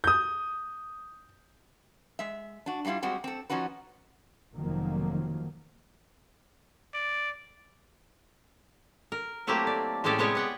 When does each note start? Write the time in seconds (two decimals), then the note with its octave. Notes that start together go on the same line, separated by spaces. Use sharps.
0.04 D#6 G6
2.19 G#3 E5
2.66 D4 F#4
2.85 G2 F#3 G3 E4 F4
3.02 G3 G#3 C4 F#4
3.24 C4 A4
3.50 F3 C#4 D#4 F#4 B4
4.54 F1 F2 D#3 F3 F#3 A#3
6.94 D5
9.12 A#4
9.47 F#3 A3 A#3 C4 E4 G4
9.67 D5
10.04 A2 G#3 C#4 G4 A4 D5
10.18 C3 G#3 B3 G4 C#5 D5
10.35 B3 F#5 G5